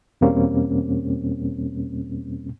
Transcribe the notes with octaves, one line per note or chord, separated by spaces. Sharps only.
E2 B2 G3 A#3 C4 C#4